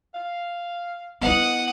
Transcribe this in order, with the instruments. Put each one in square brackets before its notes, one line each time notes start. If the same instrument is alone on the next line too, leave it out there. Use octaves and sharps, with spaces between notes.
[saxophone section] F5
[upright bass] B3 E4 [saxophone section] D#5 [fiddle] F#5 D#6